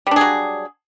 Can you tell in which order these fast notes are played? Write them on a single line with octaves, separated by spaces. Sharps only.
G3 D4 G#4 F#3